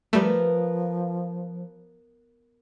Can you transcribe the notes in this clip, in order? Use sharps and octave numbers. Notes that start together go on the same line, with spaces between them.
F3 G3 A3 B3 A#4